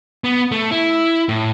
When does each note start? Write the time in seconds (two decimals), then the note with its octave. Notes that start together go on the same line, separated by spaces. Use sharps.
0.24 B3
0.52 A3
0.71 E4
1.29 A2